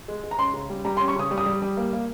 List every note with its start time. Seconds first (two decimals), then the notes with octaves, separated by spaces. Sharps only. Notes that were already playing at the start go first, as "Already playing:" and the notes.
0.08 G#3
0.23 G#3
0.31 A#5
0.38 C#4 C6
0.54 C#3
0.70 G3
0.85 G3 A#5
0.97 C6
1.00 C#4
1.08 C#6
1.16 C#3 D#6
1.31 G3
1.38 D#6
1.46 G3
1.62 G3
1.77 A#3
1.93 A#3